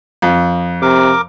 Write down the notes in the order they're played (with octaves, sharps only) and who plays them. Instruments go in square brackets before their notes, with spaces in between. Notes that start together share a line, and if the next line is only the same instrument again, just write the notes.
[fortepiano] F2
[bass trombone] C3 [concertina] A#4 D6